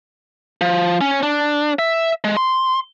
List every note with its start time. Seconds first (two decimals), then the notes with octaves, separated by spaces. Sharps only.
0.61 F3
1.01 C#4
1.23 D4
1.79 E5
2.24 G#3
2.37 C6